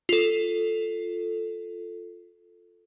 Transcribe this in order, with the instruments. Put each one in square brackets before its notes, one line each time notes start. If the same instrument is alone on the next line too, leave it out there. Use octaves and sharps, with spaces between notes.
[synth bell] F4 A4